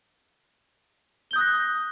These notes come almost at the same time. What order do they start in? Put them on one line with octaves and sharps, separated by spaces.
G7 G6 D#6 F#6 A#6